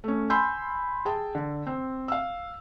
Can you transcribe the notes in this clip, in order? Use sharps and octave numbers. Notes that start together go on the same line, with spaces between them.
A3 C#4
G#5 B5 C6 E6 G6
G#4 G5 A5
D3
C4
F5 E6